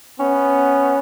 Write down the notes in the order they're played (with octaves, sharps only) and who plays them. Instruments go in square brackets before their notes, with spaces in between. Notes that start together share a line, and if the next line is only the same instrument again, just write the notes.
[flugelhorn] B3 [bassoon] C#4